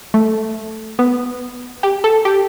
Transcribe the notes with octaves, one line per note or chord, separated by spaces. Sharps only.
A3
B3
G4
A4
G4